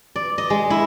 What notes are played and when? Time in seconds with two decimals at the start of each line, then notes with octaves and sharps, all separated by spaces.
0.16 D5
0.38 D#5
0.50 G#3
0.70 E4